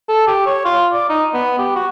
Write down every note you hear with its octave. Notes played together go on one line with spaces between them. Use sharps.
A4
G4
C#5
F4
D5
D#4
B3
G4
F#4